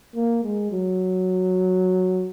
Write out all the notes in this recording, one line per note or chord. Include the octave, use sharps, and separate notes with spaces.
A#3
G#3
F#3